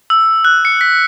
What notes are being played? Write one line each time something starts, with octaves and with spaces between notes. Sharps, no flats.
E6
F#6
C#7
B6